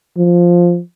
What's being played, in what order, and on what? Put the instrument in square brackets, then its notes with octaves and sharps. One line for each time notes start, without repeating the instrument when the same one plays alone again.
[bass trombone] F3